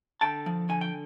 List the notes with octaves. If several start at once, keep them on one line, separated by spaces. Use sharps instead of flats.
D3 G5 A5
F3
D3 G#5
G5